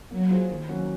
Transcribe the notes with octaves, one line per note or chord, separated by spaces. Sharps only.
F#3 A#3
F4 G#4 C5
D#3
F#3 A#3 C#4 F#4